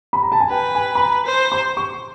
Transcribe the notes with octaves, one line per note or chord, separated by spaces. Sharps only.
B5
A#5
A5
G#5
B4 G5
G#5
B5
A#5
C5
C6
C#6